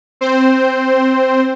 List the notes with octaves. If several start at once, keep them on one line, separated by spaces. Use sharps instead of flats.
C4 C5